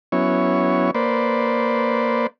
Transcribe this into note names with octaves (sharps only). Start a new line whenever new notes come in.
F#3 B3 C#4 E4 C#5
A#3 B4 C5 D5